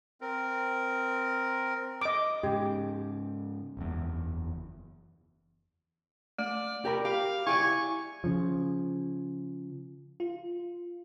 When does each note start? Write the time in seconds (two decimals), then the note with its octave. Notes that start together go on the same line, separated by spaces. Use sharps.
0.21 C4 A#4
2.02 D#5 D6
2.43 G#2 C#3 G4
3.77 F#1 E2
6.39 A3 D5
6.85 G4 A#4 D5 B5
7.05 G4 F5
7.47 E4 G4 D5 G#5 C#6
8.24 C#3 F3
10.20 F4